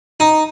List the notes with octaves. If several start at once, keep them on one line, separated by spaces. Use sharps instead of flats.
D#4